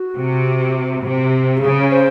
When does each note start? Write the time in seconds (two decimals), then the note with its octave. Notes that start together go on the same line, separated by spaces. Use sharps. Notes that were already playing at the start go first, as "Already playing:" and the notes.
Already playing: F#4
0.16 C3
1.02 C3
1.56 G4
1.61 C#3 G#4
1.90 C5